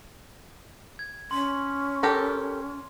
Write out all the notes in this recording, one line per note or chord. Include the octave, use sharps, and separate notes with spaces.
G#6
C#4 C6
G4 A4 A#4